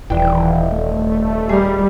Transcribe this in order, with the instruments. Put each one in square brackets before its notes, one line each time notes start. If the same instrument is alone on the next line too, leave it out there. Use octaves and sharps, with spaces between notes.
[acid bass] D#1 [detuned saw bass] E3 [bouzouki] D4 G5
[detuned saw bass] A3
[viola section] G3 [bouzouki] G#4 A#4